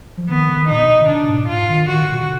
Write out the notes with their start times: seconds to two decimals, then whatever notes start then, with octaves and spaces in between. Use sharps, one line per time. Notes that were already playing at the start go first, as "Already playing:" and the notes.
0.17 F3
0.29 D#3 B3
0.50 D3
0.56 D#3
0.69 A#2 D#4
0.83 B2
1.01 D3
1.09 B2 D4
1.29 G#2
1.49 G#2 F4
1.69 D#3
1.89 D#3 F#4
2.01 D3
2.12 B2
2.23 D3